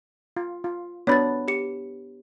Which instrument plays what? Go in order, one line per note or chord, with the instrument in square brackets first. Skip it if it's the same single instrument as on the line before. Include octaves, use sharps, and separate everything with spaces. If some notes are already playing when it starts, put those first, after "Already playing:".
[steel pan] F4
F4
[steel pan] B3 D4 F#4 [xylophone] C#5 B5 A6
[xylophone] G4 C#7